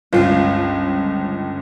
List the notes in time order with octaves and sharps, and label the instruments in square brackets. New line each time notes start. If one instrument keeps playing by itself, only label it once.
[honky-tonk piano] G1 C#2 [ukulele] F4 C5